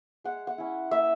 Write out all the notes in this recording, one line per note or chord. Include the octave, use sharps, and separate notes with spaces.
G#3 F#5
F#5
C#4 E4
A#3 E5